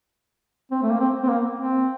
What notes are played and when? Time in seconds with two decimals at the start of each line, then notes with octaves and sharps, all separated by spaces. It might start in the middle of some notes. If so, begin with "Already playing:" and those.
0.72 C4
0.83 A3
0.91 A#3
1.00 C4
1.23 C4
1.28 A#3
1.58 C4